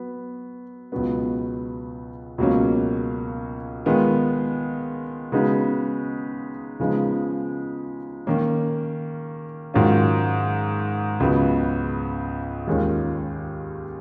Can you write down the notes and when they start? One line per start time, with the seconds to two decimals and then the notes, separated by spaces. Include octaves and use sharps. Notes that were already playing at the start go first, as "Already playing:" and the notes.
Already playing: F#3 B3
0.92 C#2 B2 F#3 B3
2.38 C#2 B2 F#3 A#3 C#4
3.85 D#3 G#3 B3 F4
5.32 C#3 G#3 B3 D#4 F#4
6.80 C#3 F3 G#3 B3 D#4
8.27 D#3 A#3 C#4
9.74 G#2 D#3 F#3 C#4 F4
11.20 C#2 C#3 F#3 B3
12.67 D#2 D#3 G#3 C#4 F4